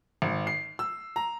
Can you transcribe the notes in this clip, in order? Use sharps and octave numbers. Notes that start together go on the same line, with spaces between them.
G#1
C7
E6
A#5